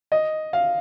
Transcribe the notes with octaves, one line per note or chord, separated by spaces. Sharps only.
D#5
F5